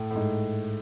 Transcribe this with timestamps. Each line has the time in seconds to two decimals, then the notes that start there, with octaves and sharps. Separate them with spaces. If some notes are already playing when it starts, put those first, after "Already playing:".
Already playing: A2
0.11 A2
0.16 G#2